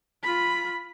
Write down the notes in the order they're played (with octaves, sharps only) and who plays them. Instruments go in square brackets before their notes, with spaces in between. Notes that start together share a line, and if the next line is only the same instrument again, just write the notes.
[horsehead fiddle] F4 B5 [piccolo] B6